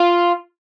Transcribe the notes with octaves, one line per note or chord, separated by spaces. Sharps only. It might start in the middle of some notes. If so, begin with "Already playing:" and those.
Already playing: F4